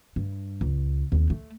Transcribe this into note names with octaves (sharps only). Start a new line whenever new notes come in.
G2
C#2
D#2 C4
A3